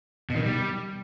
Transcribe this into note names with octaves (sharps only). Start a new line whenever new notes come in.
B2
D#3
B2
G3